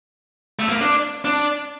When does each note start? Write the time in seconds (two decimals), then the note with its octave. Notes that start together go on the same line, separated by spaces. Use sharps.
0.59 A3
0.69 A#3
0.81 D4
1.25 D4